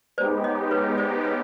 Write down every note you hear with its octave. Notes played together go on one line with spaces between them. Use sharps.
G#3 B3 D#4 G4 C5 D5
C#5 D#5
B4 C#5
C5 D5
B4 C#5